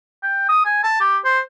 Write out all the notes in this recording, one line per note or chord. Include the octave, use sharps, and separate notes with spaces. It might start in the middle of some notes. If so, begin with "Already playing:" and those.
G5
D#6
G#5
A5
G4
C5